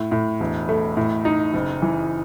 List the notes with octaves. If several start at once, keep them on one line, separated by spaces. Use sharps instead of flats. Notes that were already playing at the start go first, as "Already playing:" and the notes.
Already playing: A2
A2
E1
A3
A2
D#4
F#1
E3